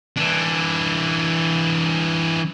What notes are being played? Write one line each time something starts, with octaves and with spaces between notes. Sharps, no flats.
E3 D4